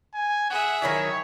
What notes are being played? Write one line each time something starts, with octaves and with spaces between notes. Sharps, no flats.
G#5
G#4 E5 F#5
D#3 F#3 E4 C#5